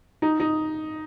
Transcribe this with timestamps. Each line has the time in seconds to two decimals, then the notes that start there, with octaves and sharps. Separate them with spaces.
0.22 D#4
0.40 D#4